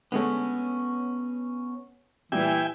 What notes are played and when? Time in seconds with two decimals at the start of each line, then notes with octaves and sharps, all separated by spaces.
0.12 D3 G#3 A3 B3 C#4
2.32 A#2 E3 G3 E5 G5 G#5